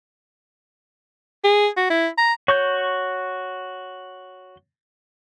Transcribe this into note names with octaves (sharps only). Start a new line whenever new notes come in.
G#4
F#4
E4
A#5
F#4 C#5 C#6 G6